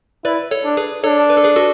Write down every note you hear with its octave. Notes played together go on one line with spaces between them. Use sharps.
E4 B4 D5
A4 C#5
D4
G#4 B4
D4 A4 C#5
B4
A4
G#4 B4
F#4 A4